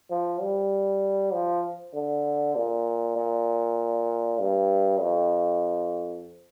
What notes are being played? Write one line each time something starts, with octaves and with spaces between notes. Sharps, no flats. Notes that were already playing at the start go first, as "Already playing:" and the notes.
F3
G3
F3
D3
A#2
A#2
G2
F2